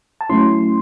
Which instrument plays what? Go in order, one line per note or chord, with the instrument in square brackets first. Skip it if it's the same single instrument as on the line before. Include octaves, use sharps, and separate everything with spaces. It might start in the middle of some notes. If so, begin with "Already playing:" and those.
[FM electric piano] A5
F#3 A3 C#4 E4 C6